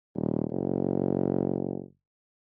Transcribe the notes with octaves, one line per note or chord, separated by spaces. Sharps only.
D#1
F#1